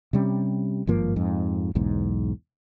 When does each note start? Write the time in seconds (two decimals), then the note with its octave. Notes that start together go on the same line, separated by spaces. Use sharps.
0.13 C3 G3 C#4
0.87 G#1 G2 F3 A#3
1.16 F2 G#2
1.75 B1 E2 G#2